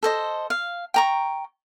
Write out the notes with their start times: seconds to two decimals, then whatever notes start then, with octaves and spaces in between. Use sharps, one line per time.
0.03 A4 C5 D#5
0.50 F5
0.94 G5 A#5 C#6